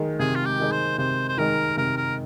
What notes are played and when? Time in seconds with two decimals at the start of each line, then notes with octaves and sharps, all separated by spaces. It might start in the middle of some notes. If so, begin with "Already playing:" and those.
Already playing: D#3 G#3 D#4
0.19 C3 G#4
0.35 F4
0.45 G4
0.59 D#3 G#3 D#4
0.72 C5
0.98 C3 C5
1.28 C5
1.37 D#3 G#3 D#4 A#4
1.77 C3 A#4
1.97 A#4